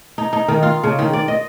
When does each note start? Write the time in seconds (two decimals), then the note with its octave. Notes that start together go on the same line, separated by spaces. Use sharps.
0.18 D#4
0.33 D#4
0.48 D#3
0.63 F4
0.83 C#3
0.99 D#3
1.13 D5
1.28 D#5